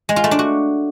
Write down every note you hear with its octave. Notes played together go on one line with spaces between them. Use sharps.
G#3
F4
A3
D4
F#4